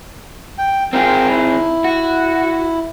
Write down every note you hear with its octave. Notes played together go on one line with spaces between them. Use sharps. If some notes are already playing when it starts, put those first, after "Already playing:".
G5
C4 D#4 F4 G#4 A#4 G5
E4
F#4